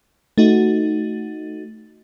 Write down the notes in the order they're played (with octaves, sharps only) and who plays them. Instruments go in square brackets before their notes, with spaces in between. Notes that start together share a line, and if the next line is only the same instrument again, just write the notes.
[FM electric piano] A3 D#4 F#4